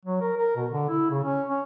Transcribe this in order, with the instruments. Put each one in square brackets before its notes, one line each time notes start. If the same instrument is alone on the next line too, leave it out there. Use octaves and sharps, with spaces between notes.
[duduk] F#3
A#4
A#4
B2
D3
E4
C#3
C#4
C#4